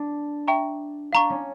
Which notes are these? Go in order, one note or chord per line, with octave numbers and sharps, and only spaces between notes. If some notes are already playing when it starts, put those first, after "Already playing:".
Already playing: D4
E5 G5 A#5 C#6
D4 F5 A#5 C#6
C#4